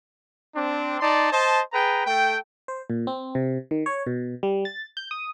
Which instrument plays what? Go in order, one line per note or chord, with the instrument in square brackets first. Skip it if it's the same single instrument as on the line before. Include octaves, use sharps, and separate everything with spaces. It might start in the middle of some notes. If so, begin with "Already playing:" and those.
[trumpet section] C4 D4
D#4 D5 A5 C6
C5 D#5 A5
G#4 B4 G5 A#5
A3 A4 G5
[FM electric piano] C5
A#2
C4
C3
D#3
C#5
B2
G3
A6
G6
D#6